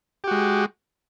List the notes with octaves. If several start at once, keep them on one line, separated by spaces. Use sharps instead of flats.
G#3 F#4 G4